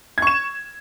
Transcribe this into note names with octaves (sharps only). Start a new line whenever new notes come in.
C#6 G#6 E7